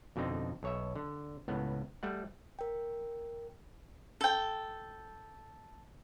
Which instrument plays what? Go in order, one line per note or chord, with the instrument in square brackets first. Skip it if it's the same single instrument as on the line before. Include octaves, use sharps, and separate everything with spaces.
[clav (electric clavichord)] F2 B2 D3 C4 D#4
B1 C#5 E5
D3
C#2 A2 B3
G3 A3 F#5
[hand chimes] A#4 G5
[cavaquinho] A4 G5